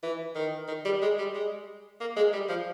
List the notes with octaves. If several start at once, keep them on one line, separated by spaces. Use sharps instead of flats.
E3
D#3
D#3
G3
G#3
G3
G#3
A#3
G#3
G3
F3